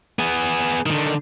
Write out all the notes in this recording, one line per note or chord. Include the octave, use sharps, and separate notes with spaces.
B3 G#4
D3 D#3